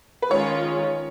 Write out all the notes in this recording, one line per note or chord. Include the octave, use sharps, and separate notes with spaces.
B4
D#3 G#3 C#4 F4 C#5